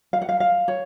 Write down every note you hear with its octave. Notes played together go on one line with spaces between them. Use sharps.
F5
F#5
F5
F5
C#5